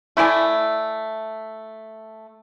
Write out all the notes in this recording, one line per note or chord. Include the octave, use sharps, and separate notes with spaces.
A3 E4 D5 G#5